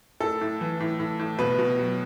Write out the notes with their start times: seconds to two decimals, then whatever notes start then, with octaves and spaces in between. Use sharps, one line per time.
0.20 A2 A4
0.41 A2
0.61 E3
0.80 A2
1.00 A2
1.19 A2
1.39 B2 B4
1.59 B2
1.79 F#3